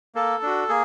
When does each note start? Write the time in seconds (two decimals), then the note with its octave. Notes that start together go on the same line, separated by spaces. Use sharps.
0.15 A#3 A4
0.43 D4 F#4
0.69 A#3 G#4